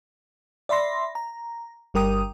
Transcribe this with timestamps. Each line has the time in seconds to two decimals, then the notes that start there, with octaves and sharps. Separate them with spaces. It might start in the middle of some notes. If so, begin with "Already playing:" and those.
0.69 D5 E5 B5 C6 A#6
1.15 A#5
1.94 G1 G3 A#4 G5 D#6